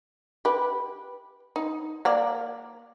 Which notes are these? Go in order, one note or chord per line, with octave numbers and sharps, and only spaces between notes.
G4 B4
D#4
A#3 A#4 D5